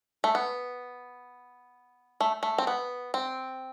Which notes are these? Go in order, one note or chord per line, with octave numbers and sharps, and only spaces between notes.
A3
B3
A3
A3
C4
B3
C4